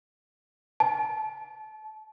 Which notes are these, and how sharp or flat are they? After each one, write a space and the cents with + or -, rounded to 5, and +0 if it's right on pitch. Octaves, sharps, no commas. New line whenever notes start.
A5 -30